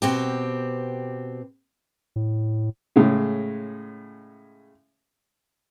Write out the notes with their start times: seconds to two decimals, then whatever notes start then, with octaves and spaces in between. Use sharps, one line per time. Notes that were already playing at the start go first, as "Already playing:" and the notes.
0.02 B2 C4 G4
2.16 A2
2.96 A2 C#3 G#3